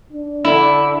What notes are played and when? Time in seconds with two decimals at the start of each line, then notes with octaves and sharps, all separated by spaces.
0.13 D4
0.44 D3 E4